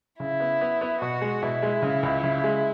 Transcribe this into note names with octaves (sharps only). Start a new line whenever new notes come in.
C#3 E4
B3
B3
B3
B2 F#4
G#3
B2 E4
G#3
C#3
C#2
C#3
G#3